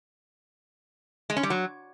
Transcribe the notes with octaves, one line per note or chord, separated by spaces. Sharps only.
G#3
C#4
G3
F#3